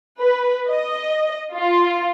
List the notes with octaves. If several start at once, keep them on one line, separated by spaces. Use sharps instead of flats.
B4
D#5
F4